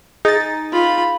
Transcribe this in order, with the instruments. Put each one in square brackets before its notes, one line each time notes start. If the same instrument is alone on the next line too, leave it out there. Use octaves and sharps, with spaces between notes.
[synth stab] D#4 A6 [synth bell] G#4
[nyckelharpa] F4 B5